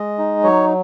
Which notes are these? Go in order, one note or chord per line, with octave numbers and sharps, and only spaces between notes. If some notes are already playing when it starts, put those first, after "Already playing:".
Already playing: G#3 D#5
D#4
F#3 C#5